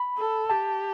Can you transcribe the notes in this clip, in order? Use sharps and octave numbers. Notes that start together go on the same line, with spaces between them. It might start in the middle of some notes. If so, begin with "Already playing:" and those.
Already playing: B5
A4
G4 A5